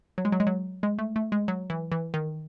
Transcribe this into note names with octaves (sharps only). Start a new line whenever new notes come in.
F#3
G#3
F#3
G#3
F#3
G#3
A3
A3
G#3
F#3
E3
E3
D#3